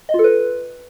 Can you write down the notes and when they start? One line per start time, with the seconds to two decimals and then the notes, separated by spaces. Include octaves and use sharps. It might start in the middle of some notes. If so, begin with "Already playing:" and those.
0.09 D#5
0.14 F4
0.19 A4
0.24 B4